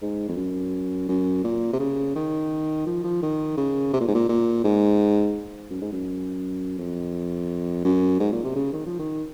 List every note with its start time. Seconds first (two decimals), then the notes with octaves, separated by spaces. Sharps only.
0.02 G#2
0.28 F2
0.37 F#2
1.08 F#2
1.44 A#2
1.73 C3
1.80 C#3
2.15 D#3
2.86 F3
3.04 F3
3.22 D#3
3.57 C#3
3.93 C3
4.01 A#2
4.08 G#2
4.15 A#2
4.29 A#2
4.64 G#2
5.71 F#2
5.82 G#2
5.92 F#2
6.78 F2
7.85 F#2
8.20 G#2
8.32 A#2
8.44 C3
8.55 C#3
8.73 D#3
8.86 F3
8.99 D#3